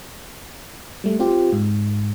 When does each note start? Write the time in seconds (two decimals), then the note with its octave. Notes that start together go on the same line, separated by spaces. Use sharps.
1.04 G3 A3
1.19 C4 F4 G4
1.53 G#2